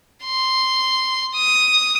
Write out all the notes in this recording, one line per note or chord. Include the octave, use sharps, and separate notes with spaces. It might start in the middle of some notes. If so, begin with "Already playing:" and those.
C6
D#6